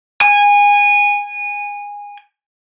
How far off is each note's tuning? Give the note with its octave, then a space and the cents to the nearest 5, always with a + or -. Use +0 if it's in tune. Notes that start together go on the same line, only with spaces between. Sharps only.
G#5 -20